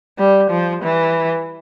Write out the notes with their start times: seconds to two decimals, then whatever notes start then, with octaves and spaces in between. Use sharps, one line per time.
0.18 G3
0.50 F3
0.83 E3